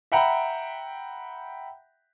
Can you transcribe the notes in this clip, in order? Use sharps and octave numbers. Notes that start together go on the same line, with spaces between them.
E5 F#5 G5 A#5 B5